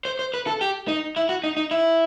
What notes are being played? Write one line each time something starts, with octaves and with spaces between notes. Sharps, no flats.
C5
C5
B4
A4
G4
D#4
E4
F#4
D#4
D#4
E4